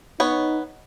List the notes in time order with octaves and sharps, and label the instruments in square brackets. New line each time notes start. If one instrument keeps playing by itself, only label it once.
[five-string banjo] B3 C#5 [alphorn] D#4